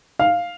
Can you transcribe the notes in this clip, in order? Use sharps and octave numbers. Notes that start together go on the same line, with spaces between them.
F5